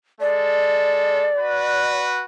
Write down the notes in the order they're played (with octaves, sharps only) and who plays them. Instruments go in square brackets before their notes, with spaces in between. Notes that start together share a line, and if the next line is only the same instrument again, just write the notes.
[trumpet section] G#3 A4 [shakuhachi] D5
[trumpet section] F#4 B4